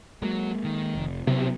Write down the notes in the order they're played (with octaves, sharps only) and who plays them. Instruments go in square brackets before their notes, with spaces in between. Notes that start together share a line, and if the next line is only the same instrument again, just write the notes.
[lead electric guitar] F#3 [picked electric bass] G#3 A#3
[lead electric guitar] D#3
[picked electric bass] F1
[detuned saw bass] C3 [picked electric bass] F#3 B3 [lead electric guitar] C4 E4